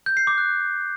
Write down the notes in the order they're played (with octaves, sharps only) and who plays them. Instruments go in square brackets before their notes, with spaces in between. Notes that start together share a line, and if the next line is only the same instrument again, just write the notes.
[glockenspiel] G6
C7
D6
F#6